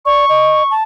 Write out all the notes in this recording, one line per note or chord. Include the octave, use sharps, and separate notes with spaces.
D5 C#6
D#5
A5